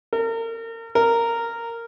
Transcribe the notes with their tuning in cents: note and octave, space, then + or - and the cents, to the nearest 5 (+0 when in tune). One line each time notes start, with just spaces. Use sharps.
A#4 -35
A#4 -10